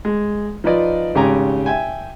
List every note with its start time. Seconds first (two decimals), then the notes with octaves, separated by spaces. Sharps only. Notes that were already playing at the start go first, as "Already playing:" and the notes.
0.05 G#3
0.64 F3 D#4 F4 B4 D5 D#5
1.15 G#1 C#3 G4 G#5 A#5
1.66 E5 G5 G#5